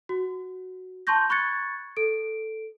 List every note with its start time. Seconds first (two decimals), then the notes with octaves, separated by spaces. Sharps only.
0.09 F#4
1.07 A5 C6 C#6 G6 A#6
1.30 B5 C#6 F#6 G#6 A6 C#7
1.97 A4 D7